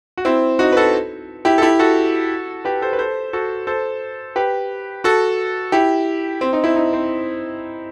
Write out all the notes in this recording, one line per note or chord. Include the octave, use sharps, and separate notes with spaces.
F#4
C4 E4
D#4 F#4
B4
F#4 A4
E4 G4
A4
E4 G4
F#4 A4
G4 B4
A4 C5
B4
A4 C5
F#4 A4
A4 C5
G4 B4
F#4 A4
E4 G4
C4
D#4
C4 E4
D#4
C4